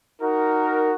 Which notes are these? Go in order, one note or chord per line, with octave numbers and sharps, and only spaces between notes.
D#4 F#4 A#4